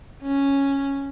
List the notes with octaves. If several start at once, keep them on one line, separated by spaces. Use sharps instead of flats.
C#4